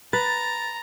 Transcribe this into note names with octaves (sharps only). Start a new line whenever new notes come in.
B4 A#5 A6